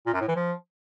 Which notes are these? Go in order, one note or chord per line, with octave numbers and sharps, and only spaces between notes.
A#2
F#2
A2
E3
F3